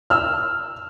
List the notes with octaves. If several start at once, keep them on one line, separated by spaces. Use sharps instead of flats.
E6 F6